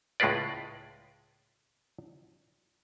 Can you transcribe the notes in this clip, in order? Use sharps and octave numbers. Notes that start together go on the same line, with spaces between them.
C#2 A2 G#3 F4 B4 D5